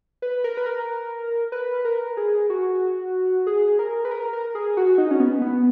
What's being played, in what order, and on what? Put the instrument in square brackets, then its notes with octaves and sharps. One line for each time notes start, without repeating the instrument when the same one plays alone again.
[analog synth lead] B4
A#4
B4
A#4
B4
A#4
G#4
F#4
G#4
A#4
B4
A#4
A#4
G#4
F#4
D#4
C#4
B3
B3